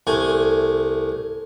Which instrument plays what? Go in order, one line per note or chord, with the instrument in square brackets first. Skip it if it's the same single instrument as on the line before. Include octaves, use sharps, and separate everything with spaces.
[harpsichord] C2 A3 G#5